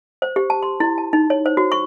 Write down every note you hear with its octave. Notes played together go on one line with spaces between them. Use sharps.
C5
G4
A5
C6
E4
A5
D#4
C#5
C5
F#4
C#6